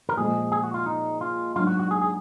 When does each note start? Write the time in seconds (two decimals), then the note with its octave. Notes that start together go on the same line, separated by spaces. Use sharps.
0.09 A#4
0.16 A#2 F3 G#3 G#4
0.52 G#4
0.63 F#4
0.74 F4
0.86 D#4
1.21 F4
1.56 G#2 F#3 D4 F4
1.67 F#4
1.80 F#4
1.91 G#4
2.01 G#4